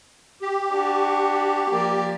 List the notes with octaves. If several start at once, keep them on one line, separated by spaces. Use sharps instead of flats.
G4
D4 F#4
F3 A#3 D5